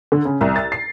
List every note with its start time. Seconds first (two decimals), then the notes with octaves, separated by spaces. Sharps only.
0.12 D3
0.25 C#3
0.41 C2
0.56 A6
0.72 C7